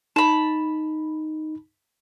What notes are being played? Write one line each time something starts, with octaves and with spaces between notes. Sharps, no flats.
D#4 A5 B5